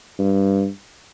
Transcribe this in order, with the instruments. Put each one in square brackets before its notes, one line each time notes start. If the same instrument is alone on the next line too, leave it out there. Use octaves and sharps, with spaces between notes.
[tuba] G2